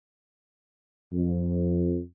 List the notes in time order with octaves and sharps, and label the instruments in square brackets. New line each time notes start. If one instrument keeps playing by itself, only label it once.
[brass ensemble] F2